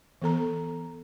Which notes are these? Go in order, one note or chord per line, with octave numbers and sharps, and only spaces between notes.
E3 B3 A4 A#5